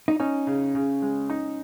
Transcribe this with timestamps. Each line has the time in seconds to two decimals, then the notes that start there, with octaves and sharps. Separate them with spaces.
0.08 D#4
0.20 C#4 D#4
0.47 C#3
0.75 C#3
1.02 G#3
1.30 D#4